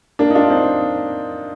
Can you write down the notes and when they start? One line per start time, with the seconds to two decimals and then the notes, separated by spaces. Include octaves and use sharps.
0.19 A#3 D4
0.30 D#4
0.35 D4 F4
0.50 C4 D#4